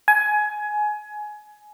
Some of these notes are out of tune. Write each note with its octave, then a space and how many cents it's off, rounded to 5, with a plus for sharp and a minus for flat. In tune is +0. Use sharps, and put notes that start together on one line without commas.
G#5 +20